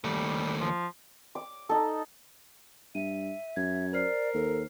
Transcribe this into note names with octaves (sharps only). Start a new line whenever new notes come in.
D#2 G3 A3
F3
D6
D#4 A4
G2 E5 D#7
F#2 G#6
A#4 C5 D5 F6 C7
D#2 A4